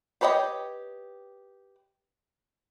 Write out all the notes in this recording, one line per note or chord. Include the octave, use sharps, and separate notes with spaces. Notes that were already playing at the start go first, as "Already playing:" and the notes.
G4 B4 C#5 D#5 G5